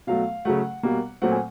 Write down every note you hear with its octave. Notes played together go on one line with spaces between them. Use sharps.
B2 F#3 A3 F5
C#3 F#3 A3 F#5
B2 G3 A#3
A#2 F#3 A3 C4 F#5
G#5